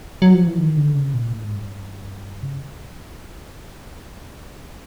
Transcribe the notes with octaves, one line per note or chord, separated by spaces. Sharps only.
F#3
F3
E3
D#3
D3
C#3
A#2
A2
G#2
G2
C#3